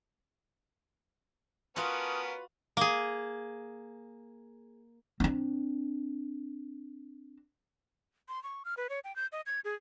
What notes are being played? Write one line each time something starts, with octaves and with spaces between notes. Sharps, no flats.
B3 C#4 F4 F#4 A#4 B4 A5 D#6
A#3 G#4
C4 D4
C6
C#6
F6
B4
C#5
G5
G6
D#5
G#6
G#4